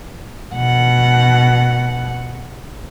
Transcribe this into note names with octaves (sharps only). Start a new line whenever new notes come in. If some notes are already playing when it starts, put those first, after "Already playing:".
B2 F#5